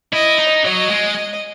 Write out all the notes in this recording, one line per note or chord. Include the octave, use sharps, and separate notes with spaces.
E4 D#5
D#4
F#3 D#5
G#3